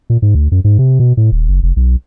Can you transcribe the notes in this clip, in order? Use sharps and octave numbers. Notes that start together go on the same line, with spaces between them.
A#2
G#2
D2
F#2
G#2
C3
B2
A2
D#1
F#1
F1
B1